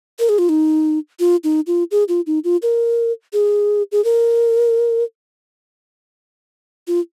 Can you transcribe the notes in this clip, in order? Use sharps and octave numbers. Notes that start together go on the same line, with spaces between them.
A#4
G#4
F4
D#4
F4
D#4
F4
G#4
F4
D#4
F4
A#4
G#4
G#4
A#4
F4